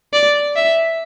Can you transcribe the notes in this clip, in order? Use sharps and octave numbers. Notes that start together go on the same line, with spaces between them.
D5
E5